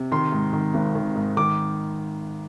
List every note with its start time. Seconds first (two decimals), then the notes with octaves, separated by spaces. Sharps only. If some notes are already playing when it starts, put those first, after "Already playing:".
Already playing: C3
0.12 D#3 C6
0.32 G#2
0.53 D#3
0.74 G#1
0.95 D#3
1.16 G#2
1.37 D#3 D6